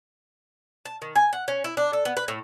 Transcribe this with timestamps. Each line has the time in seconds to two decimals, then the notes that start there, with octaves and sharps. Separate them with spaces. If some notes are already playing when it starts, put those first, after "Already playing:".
0.85 A5
1.02 D#3
1.16 G#5
1.33 F#5
1.48 C#4
1.64 E4
1.77 D4
1.93 A4
2.05 B3
2.17 B4
2.28 A2